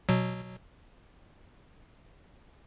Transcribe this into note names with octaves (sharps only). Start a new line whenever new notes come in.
B2 F#3